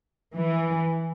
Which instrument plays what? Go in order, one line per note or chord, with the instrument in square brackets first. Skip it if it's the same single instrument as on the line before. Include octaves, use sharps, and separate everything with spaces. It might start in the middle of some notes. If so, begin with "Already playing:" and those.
[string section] E3